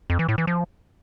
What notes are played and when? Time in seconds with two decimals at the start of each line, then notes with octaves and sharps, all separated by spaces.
0.10 F2
0.19 E3
0.29 A2
0.38 E3
0.47 F3